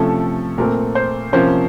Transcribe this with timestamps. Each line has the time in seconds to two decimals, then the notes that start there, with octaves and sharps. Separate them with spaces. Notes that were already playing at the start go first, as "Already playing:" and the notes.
Already playing: C3 F3 A3 C#4 A4
0.58 A#2 A3 C4 A#4
0.95 C5
1.32 C3 F3 A#3 C#4 C5